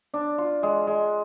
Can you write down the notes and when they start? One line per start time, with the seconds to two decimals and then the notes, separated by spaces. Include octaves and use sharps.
0.14 D4
0.38 F4
0.63 G#3
0.87 G#3